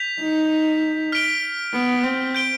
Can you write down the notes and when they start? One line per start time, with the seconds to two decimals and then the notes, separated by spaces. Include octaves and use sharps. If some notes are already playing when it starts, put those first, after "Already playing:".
Already playing: G6 B6 F7
0.20 D#4
1.12 F6 B6 D7 G7
1.73 B3
2.04 C4
2.34 G6 D7 G7